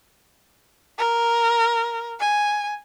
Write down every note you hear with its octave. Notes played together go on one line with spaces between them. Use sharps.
A#4
G#5